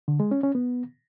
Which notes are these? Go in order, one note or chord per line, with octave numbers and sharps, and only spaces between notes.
D3
G#3
C#4
C#4
B3